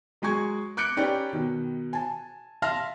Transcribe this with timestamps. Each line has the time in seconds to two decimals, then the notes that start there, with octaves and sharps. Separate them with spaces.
0.22 F#3 G#3 G#4 C#6 G#6
0.77 D6 F#6 G6 C#7 D7
0.97 C#4 D#4 G4 B4 D5 G5
1.33 B2 D#3
1.93 G#5 A5
2.62 E5 F5 A5 C6 F6 A#6